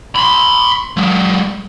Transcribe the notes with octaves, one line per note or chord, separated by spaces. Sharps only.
B5 C6
F#3 G#3